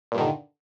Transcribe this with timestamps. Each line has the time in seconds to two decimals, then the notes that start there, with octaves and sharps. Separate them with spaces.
0.12 A#2
0.15 G2
0.18 D#3
0.21 D3